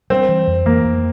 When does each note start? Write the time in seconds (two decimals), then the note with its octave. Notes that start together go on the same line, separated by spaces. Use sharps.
0.10 G3 C4
0.29 E3
0.47 F2
0.66 E3 A#3
0.84 F2